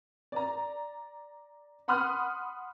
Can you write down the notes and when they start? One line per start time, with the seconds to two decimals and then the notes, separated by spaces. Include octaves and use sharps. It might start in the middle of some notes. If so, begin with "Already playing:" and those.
0.32 D5 A#5
1.88 F#5 B5 C6 D#6 F6 F#6